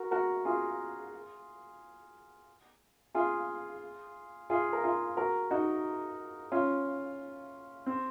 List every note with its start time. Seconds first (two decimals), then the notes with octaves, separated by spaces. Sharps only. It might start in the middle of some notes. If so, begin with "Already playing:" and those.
Already playing: F#4 A#4
0.11 F#4 A#4
0.45 F4 G#4
3.15 F4 G#4
4.50 F4 G#4
4.73 A#4
4.83 F4 G#4
5.17 F#4 A#4
5.51 D#4 F#4
6.52 C#4 F4
7.86 C4